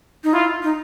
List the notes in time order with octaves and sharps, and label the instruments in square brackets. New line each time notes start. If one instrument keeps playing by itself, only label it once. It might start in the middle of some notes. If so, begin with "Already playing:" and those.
[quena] D#4
[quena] E4 [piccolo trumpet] F4
[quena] D#4